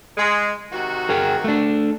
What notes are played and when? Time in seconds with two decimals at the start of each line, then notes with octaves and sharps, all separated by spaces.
0.16 G#3
0.72 C3 D#3 F#4
1.09 G#4 A#4 G5
1.44 A3 D4